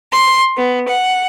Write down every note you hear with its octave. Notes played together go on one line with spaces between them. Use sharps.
C6
B3
F#5